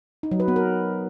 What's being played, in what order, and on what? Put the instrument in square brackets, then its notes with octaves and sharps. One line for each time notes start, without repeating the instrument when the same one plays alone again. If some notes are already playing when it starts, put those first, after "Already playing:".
[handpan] D#4
F#3
B4
B3
A#4